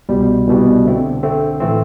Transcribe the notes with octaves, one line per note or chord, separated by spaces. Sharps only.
C2 B2 G3
C2 B2 G3
D3 A3 C4
D3 A3 C4
A2 E3 A3 C4